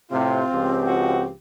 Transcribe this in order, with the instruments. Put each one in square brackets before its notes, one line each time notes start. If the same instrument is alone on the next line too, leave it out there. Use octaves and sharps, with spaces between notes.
[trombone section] A2 C3 [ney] C4 [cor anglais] F4
[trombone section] C#2 F3 G4
[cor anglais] F#4